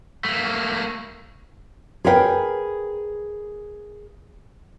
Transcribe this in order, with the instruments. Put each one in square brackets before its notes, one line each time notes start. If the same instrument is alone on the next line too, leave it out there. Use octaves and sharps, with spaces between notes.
[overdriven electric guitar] A3 A#3
[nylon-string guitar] G#4 A#4 B4 F5 G5